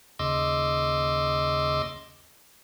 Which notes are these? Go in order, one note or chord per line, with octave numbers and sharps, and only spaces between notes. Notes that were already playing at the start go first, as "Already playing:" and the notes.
D#2 C#3 D#5 C6 D6 E6